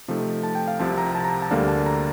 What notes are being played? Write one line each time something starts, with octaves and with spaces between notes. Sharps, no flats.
C3 F3 A3 D#4
A5
G5
F5
C2 C3 F3 C4 A5
A#5
A5
A#5
A5
D2 D3 G3 A#3 D4 F5
A5
A#5